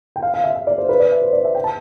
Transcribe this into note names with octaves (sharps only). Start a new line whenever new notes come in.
G5
F5
F5
E5
E5
D5
C5
B4
D5
E5
C5
D5
E5
G5
A5